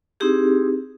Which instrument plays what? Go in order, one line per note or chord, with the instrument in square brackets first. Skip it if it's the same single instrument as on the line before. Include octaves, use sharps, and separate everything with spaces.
[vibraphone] C4 D#4 E4 G4 G#4